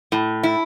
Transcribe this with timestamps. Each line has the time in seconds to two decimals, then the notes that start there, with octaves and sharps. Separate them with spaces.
0.12 A2
0.43 E4